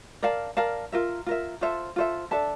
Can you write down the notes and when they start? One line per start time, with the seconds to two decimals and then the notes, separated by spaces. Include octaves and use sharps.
0.23 A#4 D5 F5 A5
0.57 A#4 D5 F5 A5
0.92 F4 A#4 E5
1.26 F4 A#4 E5
1.61 F4 A4 C5 E5
1.96 F4 A4 C5 E5
2.31 D4 A4 E5 A5